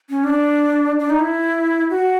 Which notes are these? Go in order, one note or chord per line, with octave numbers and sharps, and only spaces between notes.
C#4
D4
D4
D#4
E4
F#4